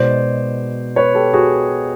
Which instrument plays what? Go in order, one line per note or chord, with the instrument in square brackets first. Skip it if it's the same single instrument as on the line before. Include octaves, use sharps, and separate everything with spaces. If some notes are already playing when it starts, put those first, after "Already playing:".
Already playing: [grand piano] B2 G#3 B3 D#4 C5 D5
B4 C#5
G4 A4
F#4 G#4